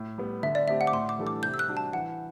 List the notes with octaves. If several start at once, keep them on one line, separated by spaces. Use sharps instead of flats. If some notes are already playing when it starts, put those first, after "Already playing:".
Already playing: A2
G3 B3
D3 E5
D5
A3 C4 G4 E5
F#5
D6
A2 C6
D6
E3 G3 D4 A4
D6
C3 G6
E6
F#6
G3 D4 F#4
A5
E3 F#5